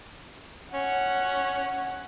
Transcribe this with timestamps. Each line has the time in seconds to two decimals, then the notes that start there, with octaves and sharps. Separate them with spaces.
0.74 C#4 F#5